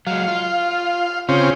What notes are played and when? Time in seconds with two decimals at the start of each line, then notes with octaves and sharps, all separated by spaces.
0.07 F#3 G#3 F5
0.28 F4
1.29 C#3 C4 C#4 F4